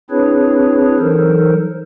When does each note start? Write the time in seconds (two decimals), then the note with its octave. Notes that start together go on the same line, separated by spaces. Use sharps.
0.10 C4 D4 E4 G#4 B4 C#5
0.99 E3 F#3 D#4 A4 A#4 C5